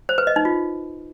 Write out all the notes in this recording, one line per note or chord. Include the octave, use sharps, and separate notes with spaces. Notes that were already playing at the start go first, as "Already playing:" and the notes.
C5
B4
D#5
D#4
F4